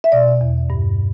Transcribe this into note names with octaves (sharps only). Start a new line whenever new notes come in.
E5
B2 D5
E2
G2